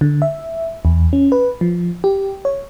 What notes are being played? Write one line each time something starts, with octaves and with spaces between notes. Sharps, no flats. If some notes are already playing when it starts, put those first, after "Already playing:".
D3
E5
E2
C#4
B4
F3
G4
C#5